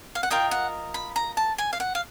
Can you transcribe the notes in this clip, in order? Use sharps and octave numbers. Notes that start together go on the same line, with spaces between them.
F5
F#5
F4 A#4 D#5 G5
F#5
B5
A#5
A5
G#5
F5
F#5
F5